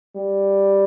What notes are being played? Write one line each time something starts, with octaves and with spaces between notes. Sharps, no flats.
G3